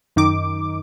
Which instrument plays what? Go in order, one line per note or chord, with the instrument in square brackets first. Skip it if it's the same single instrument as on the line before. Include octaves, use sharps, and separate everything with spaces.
[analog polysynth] F#2 D#3 D#4 D6